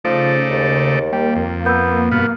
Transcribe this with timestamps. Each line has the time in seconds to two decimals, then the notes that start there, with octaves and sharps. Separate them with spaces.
0.05 C#3 F3 A3 D#4 C5 D5
0.51 D#2
1.13 G3 A#3 G5
1.36 F2
1.66 B3 E6 G6
2.12 G2 B2 B3 F6